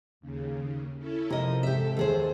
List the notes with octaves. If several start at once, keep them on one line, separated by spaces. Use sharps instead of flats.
D#2 C#3
C#4 E4 A4
C3 F3 A#4 D#5
G#2 G4 A4 E5
D#2 G#4 C5